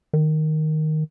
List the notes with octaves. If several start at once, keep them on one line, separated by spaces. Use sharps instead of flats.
D#3